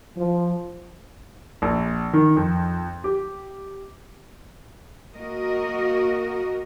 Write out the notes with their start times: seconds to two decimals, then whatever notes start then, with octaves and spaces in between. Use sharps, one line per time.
0.16 F3
1.62 A#1
2.13 D#3
2.37 F2
3.04 G4
5.17 A#3 F#4 A#4 D#5